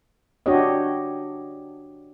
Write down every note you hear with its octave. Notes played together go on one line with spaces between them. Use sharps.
D4 F#4 G4 C#5 D#5